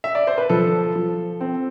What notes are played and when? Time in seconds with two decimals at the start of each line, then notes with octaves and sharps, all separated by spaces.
0.04 E5
0.15 D5
0.27 C5
0.38 B4
0.49 F3 A4
0.95 F3
1.41 C4